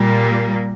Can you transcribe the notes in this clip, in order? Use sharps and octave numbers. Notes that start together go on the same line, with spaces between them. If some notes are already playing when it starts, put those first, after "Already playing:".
Already playing: A#2 G3 A#3